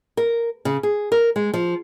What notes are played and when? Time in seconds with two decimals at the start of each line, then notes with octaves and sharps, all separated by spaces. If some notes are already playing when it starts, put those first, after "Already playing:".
0.17 A#4
0.65 C#3
0.83 G#4
1.12 A#4
1.36 G#3
1.54 F3